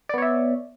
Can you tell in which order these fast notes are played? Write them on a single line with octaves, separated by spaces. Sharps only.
D5 B3 C#5 E5